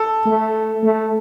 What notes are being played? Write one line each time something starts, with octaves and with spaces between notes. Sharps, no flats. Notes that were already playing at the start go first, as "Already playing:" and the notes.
Already playing: A4
A3
A3